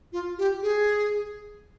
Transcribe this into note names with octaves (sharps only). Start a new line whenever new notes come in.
F4
G4
G#4